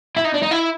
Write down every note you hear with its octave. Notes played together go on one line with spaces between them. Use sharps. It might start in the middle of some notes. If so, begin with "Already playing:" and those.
E4
D#4
D4
D#4
E4